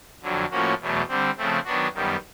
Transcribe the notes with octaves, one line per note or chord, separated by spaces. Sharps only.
F2 D3 F#3
A2 F3 A#3 C#4 F#4
E2 B2 F#3 A3
D3 G3 C4
C#3 F3 A3 C4
D#3 F#3 B3 D4 F#4
F#2 D#3 G3 B3